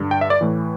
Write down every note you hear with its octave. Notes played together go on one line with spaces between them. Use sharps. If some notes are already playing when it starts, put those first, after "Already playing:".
Already playing: G2 D3
G5
E5
D5
A2 E3